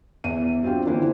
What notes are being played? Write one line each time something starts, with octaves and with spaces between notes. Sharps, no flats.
E2 E5 D#7
F#3 C4 D4 F4 G4
D3 E3 A#3 E4 C5